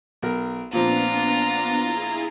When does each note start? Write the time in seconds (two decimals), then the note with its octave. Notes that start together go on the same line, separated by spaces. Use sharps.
0.22 B1 A#4
0.73 A#2 F3 B3 C4 D4 F4 A#5
1.81 E4 G#4